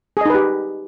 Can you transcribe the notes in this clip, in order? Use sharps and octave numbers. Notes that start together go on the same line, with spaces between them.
D#4 G4 G#4 B4 D#5